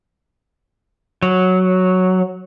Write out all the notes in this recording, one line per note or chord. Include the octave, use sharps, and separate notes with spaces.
F#3